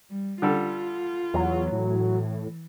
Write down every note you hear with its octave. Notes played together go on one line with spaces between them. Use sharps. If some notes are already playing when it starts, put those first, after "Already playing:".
G3
D3 G3 F4 A4
E2 F#3
A2 E3